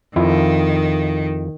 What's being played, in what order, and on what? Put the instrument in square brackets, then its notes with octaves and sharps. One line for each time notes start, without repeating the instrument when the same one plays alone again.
[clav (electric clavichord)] F2 E4 F4 [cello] D#3